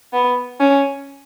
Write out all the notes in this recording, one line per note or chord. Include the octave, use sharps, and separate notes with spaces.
B3
C#4